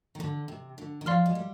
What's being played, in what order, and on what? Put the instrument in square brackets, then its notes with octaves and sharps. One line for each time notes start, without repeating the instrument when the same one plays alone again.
[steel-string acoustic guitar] D#3
D3
C3
D3
D#3
[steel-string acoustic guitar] F3 [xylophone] D5 F5 C6 F6
[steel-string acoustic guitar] G#3
G3